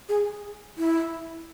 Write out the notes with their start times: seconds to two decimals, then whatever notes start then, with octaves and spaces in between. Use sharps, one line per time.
0.09 G#4
0.78 E4